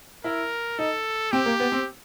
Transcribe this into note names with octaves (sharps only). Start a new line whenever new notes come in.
E4 A#4
D#4 A4
C4 G4
A#3
B3
C4